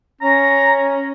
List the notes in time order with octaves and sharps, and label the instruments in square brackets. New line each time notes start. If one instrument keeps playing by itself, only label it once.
[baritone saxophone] C#4 [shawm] A#5